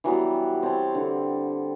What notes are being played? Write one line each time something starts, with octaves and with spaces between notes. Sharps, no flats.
E3 F#3 G3 B3
C4 C#5 A5 C6
D3